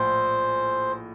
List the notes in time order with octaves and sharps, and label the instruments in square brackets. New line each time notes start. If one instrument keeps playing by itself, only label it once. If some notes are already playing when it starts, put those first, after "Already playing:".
Already playing: [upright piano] A#1 A2 [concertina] C5